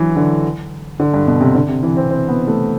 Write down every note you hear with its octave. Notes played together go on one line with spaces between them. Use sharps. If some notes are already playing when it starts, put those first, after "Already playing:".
Already playing: E3 F#3
D3
D3
G2
B2
C3
D3
C3
E3
C4
C4
B3
A3